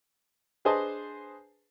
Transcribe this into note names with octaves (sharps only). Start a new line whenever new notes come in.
D4 G#4 B4 C5 D#5 A5